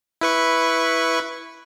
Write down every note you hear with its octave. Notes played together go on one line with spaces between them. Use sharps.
E4 B4 C#6